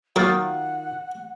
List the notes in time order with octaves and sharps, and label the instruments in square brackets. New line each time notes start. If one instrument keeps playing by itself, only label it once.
[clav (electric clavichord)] D#3 F4 [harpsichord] F#3 A#3 [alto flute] F#5